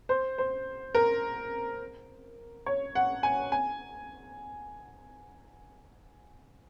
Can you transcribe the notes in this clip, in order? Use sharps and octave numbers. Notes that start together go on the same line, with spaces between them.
C5
C5
A#4
C#5
F#5
G#5
G#5